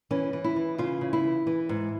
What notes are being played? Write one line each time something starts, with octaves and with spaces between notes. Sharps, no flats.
E3 C#4
E3
E4
E3
C#3 F4
C#3
E4
E3
E3
G#2